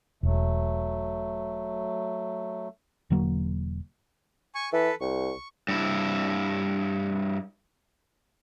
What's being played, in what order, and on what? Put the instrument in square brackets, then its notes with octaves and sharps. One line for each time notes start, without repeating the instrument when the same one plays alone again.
[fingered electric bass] E1 [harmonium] F#3 A3
[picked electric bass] E1 D3 F#3 A#3
[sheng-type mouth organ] G#5 C#6
[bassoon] E3 [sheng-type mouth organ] A4 B4
[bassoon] C2 [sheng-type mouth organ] C#6
[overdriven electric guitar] G2 E4